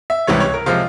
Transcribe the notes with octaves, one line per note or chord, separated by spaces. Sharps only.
E5
C#2 C3 E3 G3 C#5
C#5
A#4
C3 F3 G#3 F4